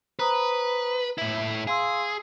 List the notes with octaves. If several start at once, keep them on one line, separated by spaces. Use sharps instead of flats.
B4 C5 A#5 D#6
A2 E4 B6
G#4 F5 C6 E6